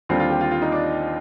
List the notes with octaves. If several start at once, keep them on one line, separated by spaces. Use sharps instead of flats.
D#2 D3 G3 C4 F4
F4
G4
F4
F4
D#4
D4